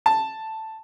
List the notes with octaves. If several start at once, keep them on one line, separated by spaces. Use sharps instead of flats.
A5